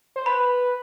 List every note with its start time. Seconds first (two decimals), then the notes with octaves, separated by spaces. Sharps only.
0.16 C5
0.26 B4 B5